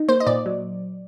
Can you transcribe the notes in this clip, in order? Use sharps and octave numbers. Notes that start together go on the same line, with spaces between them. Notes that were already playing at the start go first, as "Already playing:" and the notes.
Already playing: D#4
A#3 C5
D#5
A#2 D5
F#3